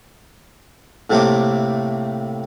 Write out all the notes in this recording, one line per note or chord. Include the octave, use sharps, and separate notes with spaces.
A2 C3 A3 A#3 C4 D6